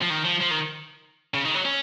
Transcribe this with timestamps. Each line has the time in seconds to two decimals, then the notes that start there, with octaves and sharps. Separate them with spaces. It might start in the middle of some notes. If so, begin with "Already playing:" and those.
0.01 F3
0.10 D#3
0.25 F3
0.41 F3
0.51 D#3
1.34 C#3
1.45 D#3
1.55 F#3
1.65 C#4